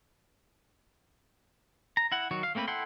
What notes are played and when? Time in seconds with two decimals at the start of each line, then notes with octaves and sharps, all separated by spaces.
1.97 A#5
2.12 E4 F#5
2.31 D#3 F#3 F#4
2.43 F5
2.55 A3 A#3 C4 A#4 B4
2.68 E4 A4 F#5 G5 C6